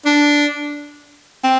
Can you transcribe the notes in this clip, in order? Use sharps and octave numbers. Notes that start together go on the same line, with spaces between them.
D4
C4